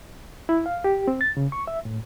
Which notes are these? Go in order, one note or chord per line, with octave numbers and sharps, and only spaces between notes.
E4
F5
G4
C4
A6
C#3
C#6
E5
A2